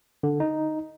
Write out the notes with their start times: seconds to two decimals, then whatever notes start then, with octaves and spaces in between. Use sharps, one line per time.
0.23 D3
0.40 D#4